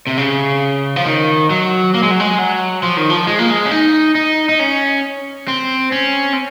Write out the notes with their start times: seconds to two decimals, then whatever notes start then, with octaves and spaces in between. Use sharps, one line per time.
0.07 C3
0.18 C#3
0.96 F3
1.05 D#3
1.50 F#3
1.94 A#3
2.03 G#3
2.11 F#3
2.20 G#3
2.39 F#3
2.83 F3
2.97 D#3
3.10 F3
3.27 G#3
3.39 A#3
3.50 G#3
3.66 C#4
3.71 D#4
4.15 D#4
4.49 D#4
4.59 C#4
5.48 C4
5.92 C#4
6.33 C4